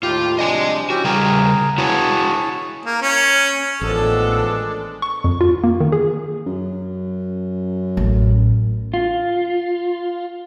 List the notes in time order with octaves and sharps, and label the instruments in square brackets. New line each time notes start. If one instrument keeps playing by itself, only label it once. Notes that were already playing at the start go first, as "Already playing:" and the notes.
[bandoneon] D#2 A2 G4 [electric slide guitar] F4
[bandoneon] C3 F3 D4 [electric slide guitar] D#5 G#5
[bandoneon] E3 C#4 G4 [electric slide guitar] F#4
[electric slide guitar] C#3 G3 G5 [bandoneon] G#4 A#4
[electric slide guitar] E4 F#4 B4 [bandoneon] G#4 C#5 A5
[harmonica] A#3
C#4
[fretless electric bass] A1 [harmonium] D#3 F3 B3 [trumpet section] G#3 D4 [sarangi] A4
[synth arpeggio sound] C#6
F2
F4
A#3
D#3
G#4
[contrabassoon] F#2
[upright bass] A1
[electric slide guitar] F4